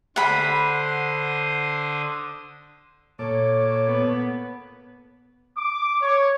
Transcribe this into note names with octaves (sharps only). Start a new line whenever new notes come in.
D3 C5 F#5 B5 D#6
A#2 A4 C#5 D6
B3
D6
C#5